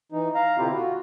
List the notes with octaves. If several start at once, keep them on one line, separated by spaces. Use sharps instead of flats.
E3 D#4
F5 A#5
B2 D3 C4 E4 F4 G4
F4 F#4